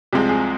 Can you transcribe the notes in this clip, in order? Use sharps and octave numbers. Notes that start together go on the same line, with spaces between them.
C2 C3 F3 G#3 C4 G4
G#4